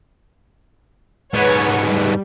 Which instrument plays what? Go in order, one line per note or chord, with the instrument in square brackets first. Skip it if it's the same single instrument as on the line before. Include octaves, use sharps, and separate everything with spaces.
[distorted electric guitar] G#2 B3 [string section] B4 C#5 F#5
[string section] G3